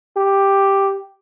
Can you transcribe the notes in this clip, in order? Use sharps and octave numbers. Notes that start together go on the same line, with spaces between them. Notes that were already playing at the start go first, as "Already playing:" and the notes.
G4